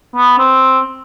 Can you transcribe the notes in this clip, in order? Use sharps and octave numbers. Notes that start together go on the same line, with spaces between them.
B3
C4